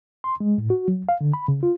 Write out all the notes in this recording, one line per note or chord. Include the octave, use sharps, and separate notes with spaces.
C6
G#3
A2
F#4
F#3
F5
D3
B5
C#3
F4